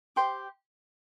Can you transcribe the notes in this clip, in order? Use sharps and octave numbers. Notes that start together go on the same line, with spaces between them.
G4 C5 G5 C6